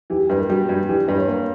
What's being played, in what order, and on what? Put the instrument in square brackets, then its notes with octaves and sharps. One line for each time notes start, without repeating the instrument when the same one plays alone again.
[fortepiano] E3 [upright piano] G4
[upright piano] G4
[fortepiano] G2 [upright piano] B4
[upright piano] A#4
[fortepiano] G3 [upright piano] F#4
[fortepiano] G2
[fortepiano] E3 [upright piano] G4
[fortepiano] G2 [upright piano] B4
[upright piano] C#5
[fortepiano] A#3 [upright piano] C#5